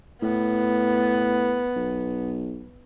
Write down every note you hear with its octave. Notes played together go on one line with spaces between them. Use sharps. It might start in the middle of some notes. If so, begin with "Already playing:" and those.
A2 B3
B1